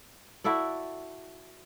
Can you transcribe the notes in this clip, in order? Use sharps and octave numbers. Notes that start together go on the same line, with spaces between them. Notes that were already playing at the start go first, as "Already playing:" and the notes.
E4 F#4 A4 D5